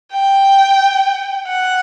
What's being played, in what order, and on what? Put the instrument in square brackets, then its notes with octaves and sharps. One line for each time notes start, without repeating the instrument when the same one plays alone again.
[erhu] G5
F#5